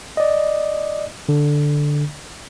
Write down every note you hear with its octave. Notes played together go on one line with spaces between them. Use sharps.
D5 D#5
D3